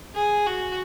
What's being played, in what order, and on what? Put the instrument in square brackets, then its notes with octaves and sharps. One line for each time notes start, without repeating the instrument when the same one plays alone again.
[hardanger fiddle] G#4
F#4